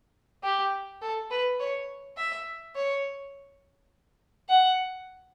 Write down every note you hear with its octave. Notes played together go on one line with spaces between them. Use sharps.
G4
A4
B4
C#5
E5
C#5
F#5